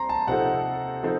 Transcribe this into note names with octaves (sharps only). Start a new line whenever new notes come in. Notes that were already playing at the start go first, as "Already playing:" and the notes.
Already playing: C4 A#5 C6
A5
C3 F3 C4 D#4 A4 F#5
F3 C4 D#4 A4